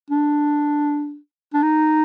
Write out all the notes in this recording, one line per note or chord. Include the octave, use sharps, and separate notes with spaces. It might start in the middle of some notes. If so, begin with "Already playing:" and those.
D4
D4
D#4